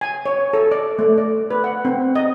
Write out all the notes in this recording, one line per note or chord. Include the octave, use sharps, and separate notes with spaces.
G#5
C#5
A4
D5
A3
D5
B4
F#5
C4
D#5